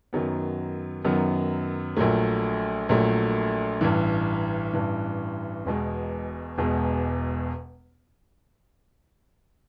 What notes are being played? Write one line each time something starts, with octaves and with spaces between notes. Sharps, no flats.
F#2 D#3 F#3 B3
F#2 D#3 F#3 B3
A#1 A#2 F#3 A3
A#1 A#2 F#3 A3
A1 G2 E3
A1 G2 E3
E1 E2 B2 G#3
E1 E2 B2 G#3